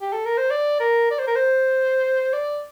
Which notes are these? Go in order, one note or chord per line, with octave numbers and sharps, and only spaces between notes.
G4
A4
A#4
C5
D5
A#4
D5
C5
A#4
C5
D5